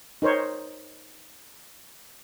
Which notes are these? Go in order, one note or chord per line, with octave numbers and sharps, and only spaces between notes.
D#4 A#4 C5 C#5